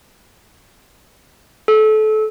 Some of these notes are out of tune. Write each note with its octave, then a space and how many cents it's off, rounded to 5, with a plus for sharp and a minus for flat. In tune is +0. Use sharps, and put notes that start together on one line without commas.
A4 -25